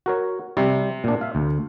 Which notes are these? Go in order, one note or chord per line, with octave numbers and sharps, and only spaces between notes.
F#4 A#4 C#5
C3 G3
A#2 D4
E5 F5
D2